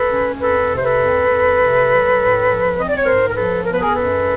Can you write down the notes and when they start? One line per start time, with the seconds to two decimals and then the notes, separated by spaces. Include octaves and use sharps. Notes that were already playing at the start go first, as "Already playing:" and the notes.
Already playing: A4 B4
0.11 C#4
0.40 F2 A4 B4
0.69 C3
0.76 C5
0.84 A4 B4
0.99 F2
1.29 F2
1.57 C3
1.88 F#3
2.17 A2
2.47 F3
2.76 C4 D#5
2.88 D5
2.97 C#5
3.05 G#2 A#4 C5
3.30 A#4
3.34 F3 A4 B4
3.65 B3 A#4
3.73 B4
3.80 G#4 A#4
3.93 F#2 A4 B4